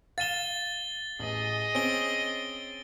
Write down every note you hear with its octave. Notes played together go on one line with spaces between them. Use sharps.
F5 A6 D#7 E7 G7
A1 G#4 D#5 F#7
C4 C#4 D7 G7